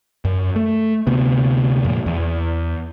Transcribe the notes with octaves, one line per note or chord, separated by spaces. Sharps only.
F#2
A3
D2 C3 B3
F2 A#2
E2